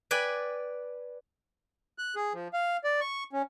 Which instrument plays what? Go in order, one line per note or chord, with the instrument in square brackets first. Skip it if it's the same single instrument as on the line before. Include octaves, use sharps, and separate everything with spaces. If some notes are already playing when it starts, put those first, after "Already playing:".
[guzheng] B4 D5 G5 G#5 B5
[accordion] F#6
G#4
F3
F5
D5
C#6
C#4